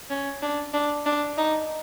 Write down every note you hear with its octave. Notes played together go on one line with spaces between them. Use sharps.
C#4
D4
D4
D4
D#4